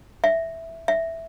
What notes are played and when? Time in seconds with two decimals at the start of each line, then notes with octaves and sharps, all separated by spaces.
0.24 E5
0.88 E5